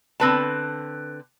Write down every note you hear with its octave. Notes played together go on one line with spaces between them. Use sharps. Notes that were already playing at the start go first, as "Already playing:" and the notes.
D3 C4 B4 A5